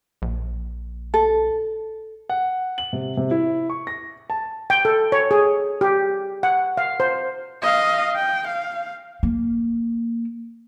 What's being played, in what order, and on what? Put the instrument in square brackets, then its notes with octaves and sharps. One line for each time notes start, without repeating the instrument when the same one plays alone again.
[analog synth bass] A#1
[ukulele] A4
[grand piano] F#5
F#7
C3
C3
E4
C#6
A#6
A5
[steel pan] G5
A4
C#5
G#4
G4
F#5
F5
C5
[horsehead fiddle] D#5 F5
G5
F5
[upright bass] A#3